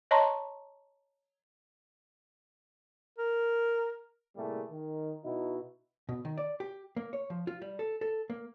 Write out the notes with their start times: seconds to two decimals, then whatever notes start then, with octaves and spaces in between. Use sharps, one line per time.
0.11 C#5 D#5 A5 A#5 C6 C#6
3.18 A#4
4.36 A2 C3 G3 A3 A#3 G#4
4.71 D#3
5.24 B2 D#4 E4 F#4
6.09 B2
6.25 D#3
6.38 D5
6.60 G4
6.96 A#3
7.13 C#5
7.30 F3
7.47 F4
7.62 G3
7.79 A4
8.01 A4
8.30 A#3